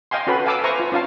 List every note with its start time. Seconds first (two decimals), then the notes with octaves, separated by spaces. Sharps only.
0.11 D#5 F5 G5 G#5 C6
0.27 C#4 F#4 A4 B4 B5
0.46 F5 G#5 A5 D6 E6
0.64 B4 C5 E5 G#5 A#5 C#6
0.80 F4
0.92 C#4 D#4 F4 F5 A5